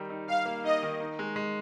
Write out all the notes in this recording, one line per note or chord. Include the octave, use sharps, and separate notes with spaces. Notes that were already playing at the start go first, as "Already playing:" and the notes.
Already playing: D#3 G3 D#4
D#4
G3 F5
A#3
D#4 D#5
D#3
D#4
G#3
G#3